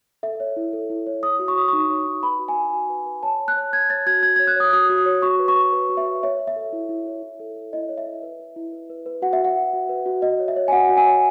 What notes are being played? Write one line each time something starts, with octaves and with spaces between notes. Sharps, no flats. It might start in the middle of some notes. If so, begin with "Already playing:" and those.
A4 E5
C#5
E4
A4
E4
C#5
C#5 D#6
F#4
C#6
C#5 D#6
D#4 C#6
C#5
D#4
B4 B5
F#4
G#5
F#4
F#4
B4
B4
C#5 A5
C#5
F#6
C#5
C#5 G#6
C#5 A6
F#4 G#6
F#4 G#6
C#5 G#6
F#6
C#5 D#6
F#4 D#6
F#4
D#6
C#5
F#4 C#6
B4
C#6
B4
B4
F#4
E5
B4
C#5 E5
C#5
E5
A4
E4
E4
C#5
E4
A4
A4
E4 D#5
C#5
E5
E4
B4
B4
E4
B4
B4
B4
F#4 F#5
E5
F#4
F#5
F#4
F#4
B4
F#4
F#4 D#5
C#5
E5
C#5
G#5
F#4 F#5
F#4
G#5
C#5